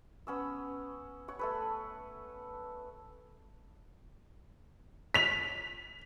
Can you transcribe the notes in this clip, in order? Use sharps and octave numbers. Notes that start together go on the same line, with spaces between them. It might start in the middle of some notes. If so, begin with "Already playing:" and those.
B3 C#4 E6
C#5 F#5
A3 A4 B4
B6 F7